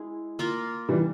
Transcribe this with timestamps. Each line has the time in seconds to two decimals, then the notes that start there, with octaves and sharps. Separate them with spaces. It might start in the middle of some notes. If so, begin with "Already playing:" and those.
Already playing: G#3 E4 G#4
0.39 A#3 F4 A#4
0.89 E3 G3